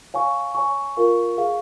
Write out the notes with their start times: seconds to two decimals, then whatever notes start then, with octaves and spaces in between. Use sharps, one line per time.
0.14 C#5 F5 G#5 C#6
0.55 C#5 G#5 C#6
0.97 F4 A#4 F5 C#6
1.37 G#4 F5 C#6